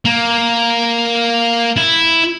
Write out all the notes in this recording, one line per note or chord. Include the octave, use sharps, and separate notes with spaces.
A#3
E4